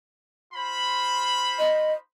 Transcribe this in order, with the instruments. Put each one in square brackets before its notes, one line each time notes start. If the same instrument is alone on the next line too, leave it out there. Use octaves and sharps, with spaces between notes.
[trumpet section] F4 C5 B5
[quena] D#5